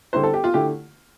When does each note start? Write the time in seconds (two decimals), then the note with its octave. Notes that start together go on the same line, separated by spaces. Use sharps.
0.13 D3 G3 C4 E4 C5
0.23 A4
0.34 G4
0.44 F4
0.54 D3 A3 E4 G4